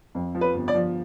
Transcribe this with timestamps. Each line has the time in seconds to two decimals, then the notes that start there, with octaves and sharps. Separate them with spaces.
0.15 F2
0.35 F3
0.41 B4
0.54 G1
0.68 D5
0.74 F3